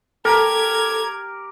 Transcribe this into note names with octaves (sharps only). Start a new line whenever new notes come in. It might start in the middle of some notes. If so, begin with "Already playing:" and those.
G4 A4 A#4 A#5 G#6